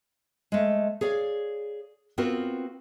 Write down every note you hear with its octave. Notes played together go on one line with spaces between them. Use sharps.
G#3 A3
G#4 C#5 D5 F5
B3 C4 F4 F#4 A#4